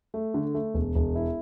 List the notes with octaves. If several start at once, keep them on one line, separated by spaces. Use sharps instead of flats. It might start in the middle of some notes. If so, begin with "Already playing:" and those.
A3
D3
A3
E1
E1
E4